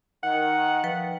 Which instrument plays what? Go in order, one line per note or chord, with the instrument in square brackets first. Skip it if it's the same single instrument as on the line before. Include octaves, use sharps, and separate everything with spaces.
[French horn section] D#3 [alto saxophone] F#5
[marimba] F3 B4 G5